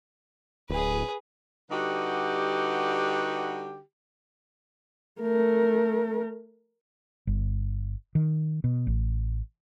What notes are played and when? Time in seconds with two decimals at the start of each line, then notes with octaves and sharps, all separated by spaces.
0.70 D1 G#4 B4
1.70 D3 G3 D#4 F#4 G4 B4
5.21 A3 A#4
7.27 G1
8.15 D#3
8.64 B2
8.87 A1